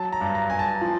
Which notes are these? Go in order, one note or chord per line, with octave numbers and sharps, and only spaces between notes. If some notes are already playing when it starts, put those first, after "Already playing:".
Already playing: F#3 A5
A#5
G2
A#5
G2 G#5
A5
F3